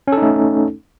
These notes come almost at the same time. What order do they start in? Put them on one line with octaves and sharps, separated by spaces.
C#4 A4 D#4 A3